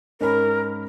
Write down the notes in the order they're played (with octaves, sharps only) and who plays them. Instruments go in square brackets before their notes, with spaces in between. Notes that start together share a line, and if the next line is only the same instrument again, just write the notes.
[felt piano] G#2 C#4 B5 [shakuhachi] A#4